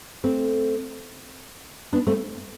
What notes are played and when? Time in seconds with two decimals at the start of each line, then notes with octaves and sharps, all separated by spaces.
0.24 A3 C4
1.93 B3 D4
2.07 A3 C4